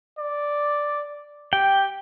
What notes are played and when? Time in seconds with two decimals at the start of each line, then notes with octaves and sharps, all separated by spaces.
0.18 D5
1.53 G4 G5